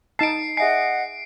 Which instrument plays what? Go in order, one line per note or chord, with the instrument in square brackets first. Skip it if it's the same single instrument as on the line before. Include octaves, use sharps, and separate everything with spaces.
[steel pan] D#4 A5 [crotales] C7 D7
[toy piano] G#4 E5 G#5 [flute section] D#5 F#5 [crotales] C7